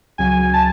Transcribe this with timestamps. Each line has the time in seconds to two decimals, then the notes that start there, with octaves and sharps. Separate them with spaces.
0.18 C#2 C#3 F#3 G#5
0.54 A5